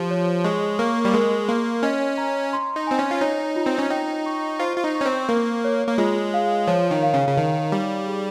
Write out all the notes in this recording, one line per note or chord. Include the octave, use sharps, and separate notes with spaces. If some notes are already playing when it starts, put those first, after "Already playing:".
Already playing: F3 G4
C#5
G#3 C#6
A#3 C#6
G3
G#3 A#4
A#3 C6
C#4 D#5
A#5
C6
D#4
C4 G#5
C#4
F4
D#4 C#5
F4
C4
C#4
D#4 G5
C#6
F4 C5
F4
D#4
C#6
C#4
C4
A#3 A#4
C#5
A#3
G#3 F4
F5
F3 C#5
D#3
F5
C#3
C#3
D#3 D#4
G3 D#4
G#4